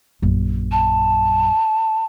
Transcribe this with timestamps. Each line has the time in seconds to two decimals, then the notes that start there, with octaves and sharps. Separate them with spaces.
0.22 A#1 F#2
0.72 A5